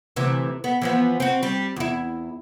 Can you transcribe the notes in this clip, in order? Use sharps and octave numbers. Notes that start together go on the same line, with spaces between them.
D2 C3 E3
B3
E3 F3 B3
C4 F#4
G3
E2 E4